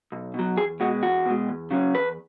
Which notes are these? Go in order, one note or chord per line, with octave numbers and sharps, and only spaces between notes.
B1
B2 F#3
E2 G#4
B2 G#3 F#4
E2 F#4
B2 G#3
E2
C#3 F#3 C#4
E2 B4